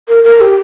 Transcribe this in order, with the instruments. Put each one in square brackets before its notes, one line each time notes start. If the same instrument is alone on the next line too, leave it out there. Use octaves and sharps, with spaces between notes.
[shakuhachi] A#4
A#4
G4